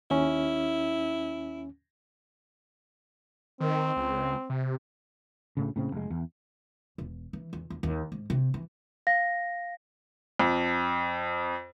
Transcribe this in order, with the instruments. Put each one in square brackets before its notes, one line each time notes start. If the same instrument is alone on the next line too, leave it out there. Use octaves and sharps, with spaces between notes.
[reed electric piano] D#2 C#4 [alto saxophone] E4
[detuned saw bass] D#3 [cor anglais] C4
[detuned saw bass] C#2
C3
[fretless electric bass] D2 A2 C#3
A2 C#3 C4
F1 G#3
E2
[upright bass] E1
E3
E2
E2
D#2
G#2
C3
E3
[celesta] F5 A#6
[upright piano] F2